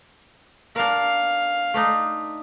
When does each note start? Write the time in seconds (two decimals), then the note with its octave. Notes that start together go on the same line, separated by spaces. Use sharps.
0.76 D4 A#4 F5
1.74 A3 D4 D#4